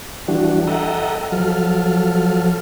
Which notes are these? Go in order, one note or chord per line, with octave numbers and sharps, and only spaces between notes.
E3 G3 D4 F#4
A4 D#5 E5 F#5 G5 A#5
F3 F#3 A4 F6